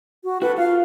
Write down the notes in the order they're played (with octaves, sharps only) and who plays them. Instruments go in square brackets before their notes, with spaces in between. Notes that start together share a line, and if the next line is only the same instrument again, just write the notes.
[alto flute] F#4
[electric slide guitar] F#4 A4 [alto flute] B4
[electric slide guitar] F4 [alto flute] F5